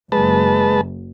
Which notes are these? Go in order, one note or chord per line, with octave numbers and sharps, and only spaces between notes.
F#1 G#3 B4 A5